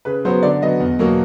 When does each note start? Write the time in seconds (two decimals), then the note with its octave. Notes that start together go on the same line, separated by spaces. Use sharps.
0.05 C#3 B4
0.25 F#3 B3 C5
0.43 D3 D5
0.62 F#3 B3 D#5
0.80 E2
0.99 B2 F#3 A#3